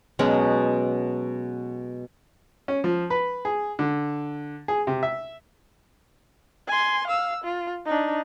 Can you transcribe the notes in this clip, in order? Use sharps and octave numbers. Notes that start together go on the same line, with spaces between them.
B2 F#3 G#3 C#4
C#4
F3
B4
G#4
D3
G#4
C3
E5
G#5 C6
F5 E6
F4
D4 D#4